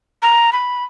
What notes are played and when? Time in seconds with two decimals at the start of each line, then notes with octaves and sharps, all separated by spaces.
0.22 A#5
0.53 B5